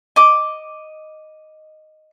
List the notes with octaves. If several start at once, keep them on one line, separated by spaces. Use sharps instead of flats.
D#5 D6